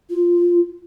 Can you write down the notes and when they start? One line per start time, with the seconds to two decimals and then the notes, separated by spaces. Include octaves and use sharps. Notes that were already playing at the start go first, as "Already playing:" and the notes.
0.10 F4